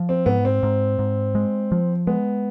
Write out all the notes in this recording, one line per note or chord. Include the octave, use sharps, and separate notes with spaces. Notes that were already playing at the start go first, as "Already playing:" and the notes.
Already playing: F3
C4
G#2 B3
C4
G#2
G#2
G#3
F3
G#3 B3